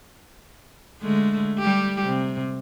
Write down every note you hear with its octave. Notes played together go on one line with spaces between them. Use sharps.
D3 G#3 A3
G3 G4
C3